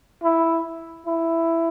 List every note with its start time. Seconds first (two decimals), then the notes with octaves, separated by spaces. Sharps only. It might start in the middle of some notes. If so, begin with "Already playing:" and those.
0.24 E4
1.07 E4